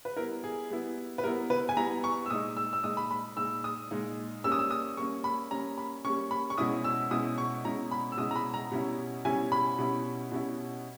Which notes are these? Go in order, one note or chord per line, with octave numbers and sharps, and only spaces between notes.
B4
G3 B3 E4 A#4
G#4
G3 B3 E4
B4
G3 B3 E4 A#4
B4
G#5
G3 B3 E4 A#5
C#6
E6
A#2 G#3 D#4 D#6
E6
E6
A#2 G#3 D#4 D#6
B5
B5
A#2 G#3 D#4 E6
D#6
A#2 G#3 D#4
G3 A#3 C#4 E6
D#6
E6
D#6
G3 A#3 C#4 C#6
B5
G3 A#3 C#4 A#5
B5
G3 A#3 C#4 C#6
B5
C#6
B2 G#3 C#4 E4 D#6
E6
B2 G#3 C#4 E4 D#6
C#6
B2 G#3 C#4 E4 A#5
B5
E6
B2 G#3 C#4 E4 D#6
A#5
B5
A#5
B2 G3 C#4 E4
B2 G3 C#4 E4 G#5
B5
B2 G3 C#4 E4
B2 G3 C#4 E4